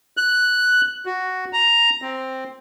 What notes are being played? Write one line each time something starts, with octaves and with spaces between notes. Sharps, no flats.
F#6
F#4
A#5
C4